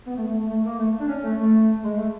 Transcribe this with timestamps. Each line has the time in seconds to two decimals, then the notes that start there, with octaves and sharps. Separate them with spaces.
0.06 B3
0.16 A3
0.27 A3
0.38 A3
0.49 A3
0.64 A#3
0.79 A3
1.00 D4
1.08 C#4
1.23 A3
1.39 A3
1.83 G#3
1.97 A3